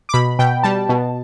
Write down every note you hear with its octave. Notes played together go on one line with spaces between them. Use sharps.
D6
B2 B5
B2 G5
G3 A5
B2